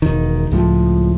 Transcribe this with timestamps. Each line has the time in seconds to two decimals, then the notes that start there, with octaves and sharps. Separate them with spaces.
0.02 E1 D#3
0.52 C#2 A2 F3